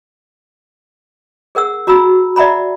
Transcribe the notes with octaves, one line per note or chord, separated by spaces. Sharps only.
G#4 A#4 F#5 E6
F#4 A#5 B5 E6
D5 E5 F#5 A#5 B5